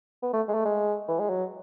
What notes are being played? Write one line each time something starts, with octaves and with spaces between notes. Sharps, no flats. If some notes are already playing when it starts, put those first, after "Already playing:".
B3
A3
G#3
A3
G#3
E3
G#3
F#3